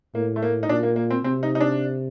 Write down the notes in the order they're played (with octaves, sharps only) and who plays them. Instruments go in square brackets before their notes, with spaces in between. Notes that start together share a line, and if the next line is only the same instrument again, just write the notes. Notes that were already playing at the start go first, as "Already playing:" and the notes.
[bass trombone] A2 [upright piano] A#3
[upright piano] A3
A#3
D#4
[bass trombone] A#2 [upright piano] D4
[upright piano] A#3
A#3
C4
[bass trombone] C3 [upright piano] C4
[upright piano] D#4
D#4
D4